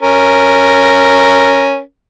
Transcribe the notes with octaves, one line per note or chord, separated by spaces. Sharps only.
C#4 A#4